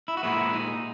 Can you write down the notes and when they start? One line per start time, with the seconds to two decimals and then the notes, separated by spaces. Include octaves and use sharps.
0.08 E4
0.17 F#4
0.23 A#2 G#3 B3 E4
0.53 D#4